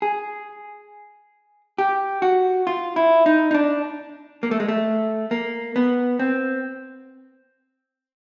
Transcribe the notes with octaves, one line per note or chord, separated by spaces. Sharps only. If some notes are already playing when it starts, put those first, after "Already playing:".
G#4
G4
F#4
F4
E4
D#4
D#4
D4
A#3
A3
G#3
A3
A#3
B3
C4